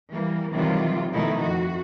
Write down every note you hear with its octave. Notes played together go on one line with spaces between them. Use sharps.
E3 G3 A#3
C3 D#3 E3 F#3 G3 F4
B2 D#3 F3 A3 D#4 E4
F2 F#4